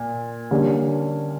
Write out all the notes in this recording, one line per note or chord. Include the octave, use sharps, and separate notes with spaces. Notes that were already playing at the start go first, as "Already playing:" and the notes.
Already playing: A#2
D3 G3 A#3 C#4